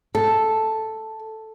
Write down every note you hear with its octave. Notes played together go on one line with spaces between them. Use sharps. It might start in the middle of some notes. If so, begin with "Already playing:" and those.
A4